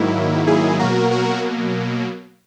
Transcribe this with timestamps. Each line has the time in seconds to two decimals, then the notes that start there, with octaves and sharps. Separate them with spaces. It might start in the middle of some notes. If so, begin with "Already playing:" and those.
Already playing: G#2 D#3 F#3 A#3 E4
0.47 E4 G#4
0.79 B2 F#3 A#3 F#4 A#4
1.11 F#4 A#4